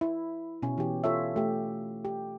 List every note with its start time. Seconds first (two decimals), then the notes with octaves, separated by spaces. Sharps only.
0.01 E4
0.62 B2 C#4
0.78 E3 G4
1.04 F4 A4 C#5 E5
1.36 A3 G4
2.05 G4